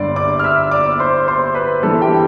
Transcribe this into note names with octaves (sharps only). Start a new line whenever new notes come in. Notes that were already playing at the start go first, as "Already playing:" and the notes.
Already playing: G1 G2 D3 D5 C6 D6
D5 D6
F6
E5 E6
D5 D6
C5 C6
C5 C6
B4 B5
G1 G2 E3 A4 A5
G4 G5